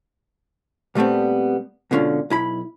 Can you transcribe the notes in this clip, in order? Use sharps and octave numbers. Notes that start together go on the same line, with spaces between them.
A#2 G3 A3 B3 C4
G#2 B2 D3 C#4 F4
B1 E4 B5